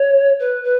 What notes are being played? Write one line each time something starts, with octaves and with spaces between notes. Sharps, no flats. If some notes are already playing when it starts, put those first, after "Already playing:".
Already playing: C#5
B4
B4